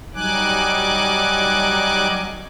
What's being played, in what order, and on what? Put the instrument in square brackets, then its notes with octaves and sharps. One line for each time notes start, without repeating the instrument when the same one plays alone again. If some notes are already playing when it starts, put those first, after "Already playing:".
[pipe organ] F#3 G3 D#4 G#5 D6 F#6